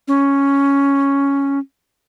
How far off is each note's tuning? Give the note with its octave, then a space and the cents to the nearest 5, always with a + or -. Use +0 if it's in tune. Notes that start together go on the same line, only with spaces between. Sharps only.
C#4 +5